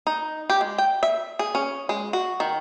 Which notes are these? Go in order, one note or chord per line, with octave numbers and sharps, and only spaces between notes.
D#4
G4
G#3
G5
E5
G#4
C#4
G#3
F#4
D#3